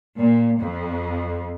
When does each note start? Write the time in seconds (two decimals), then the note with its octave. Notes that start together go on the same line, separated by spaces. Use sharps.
0.19 A#2
0.59 F2